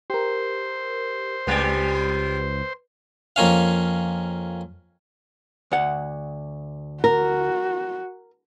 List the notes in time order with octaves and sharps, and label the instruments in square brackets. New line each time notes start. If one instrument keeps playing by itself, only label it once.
[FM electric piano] G4 A#4 [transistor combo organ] C5
[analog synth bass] C#2 [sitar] G3 G#3 D5 [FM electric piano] B4
[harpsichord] F2 A#3 C#4 F5
[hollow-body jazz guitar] D2 F#5
[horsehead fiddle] F#4 [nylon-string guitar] A#4